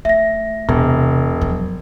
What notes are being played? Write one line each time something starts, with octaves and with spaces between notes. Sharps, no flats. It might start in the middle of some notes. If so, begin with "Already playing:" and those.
A3 E5 A#6
E1 C3
F2 F#3